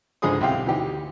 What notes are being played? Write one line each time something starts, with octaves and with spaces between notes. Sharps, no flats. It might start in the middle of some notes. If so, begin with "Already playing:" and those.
C#2 G#2 D3 G#4 C5 D#6
B1 C4 E4 G4 F5 G5
D2 E3 D#4 G4